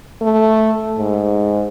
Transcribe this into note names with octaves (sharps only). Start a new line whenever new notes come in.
A3
G#2